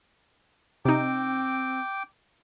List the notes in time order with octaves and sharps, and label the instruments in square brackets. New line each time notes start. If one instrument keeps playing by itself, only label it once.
[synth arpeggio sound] C3 D#4 [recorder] C4 [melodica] G5 D6